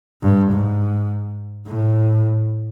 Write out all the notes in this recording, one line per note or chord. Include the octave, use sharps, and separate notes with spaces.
G2
G#2
A2